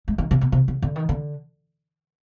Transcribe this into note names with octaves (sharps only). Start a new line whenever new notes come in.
G#3
D#3
C3
B2
C3
C#3
D3
D#3
D3